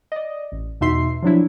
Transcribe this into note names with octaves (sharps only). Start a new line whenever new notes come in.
D5 D#5
A1
E2 B2 D#4 E5 C6 C7
F3 F#3 D4 E4